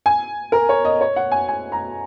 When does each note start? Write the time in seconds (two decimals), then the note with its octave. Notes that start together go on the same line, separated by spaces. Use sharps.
0.06 G#5
0.52 A#4
0.69 C#5
0.85 D#5
1.01 C#5
1.16 F#5
1.32 G#5
1.48 G#5
1.72 A#5